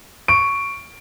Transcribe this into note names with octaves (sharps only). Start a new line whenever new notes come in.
C#6 D7